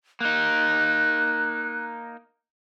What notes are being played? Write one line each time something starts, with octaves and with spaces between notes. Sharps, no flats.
A#3 D#4 F#6